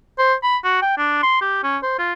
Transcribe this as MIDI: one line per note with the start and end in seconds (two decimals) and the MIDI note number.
0.18 0.34 72
0.43 0.57 83
0.64 0.81 66
0.82 0.97 79
0.97 1.22 62
1.23 1.41 84
1.41 1.63 67
1.63 1.78 61
1.83 1.97 72
1.98 2.13 65